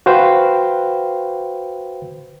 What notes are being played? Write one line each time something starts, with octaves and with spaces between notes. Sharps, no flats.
F#4 B4 C5 F5 G5